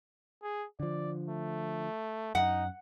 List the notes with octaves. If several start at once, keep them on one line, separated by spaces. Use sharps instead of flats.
G#4
D3 F3 D5
A3
F#2 D#4 F#5